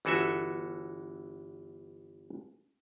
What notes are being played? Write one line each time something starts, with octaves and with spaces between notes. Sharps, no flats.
G1 E3 F#4 A4 E5